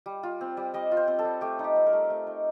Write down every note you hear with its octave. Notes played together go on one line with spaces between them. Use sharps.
G3
F4
C4
G3
G3 D#5
F4
C5
C4
A4
G3
A3 G4
D#4 G4
C4
A#4
A3
A3
D#4